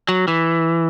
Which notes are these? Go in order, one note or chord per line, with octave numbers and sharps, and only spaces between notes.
F#3
E3